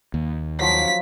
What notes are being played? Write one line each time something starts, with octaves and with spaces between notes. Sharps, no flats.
D#2
F3 F#3 B6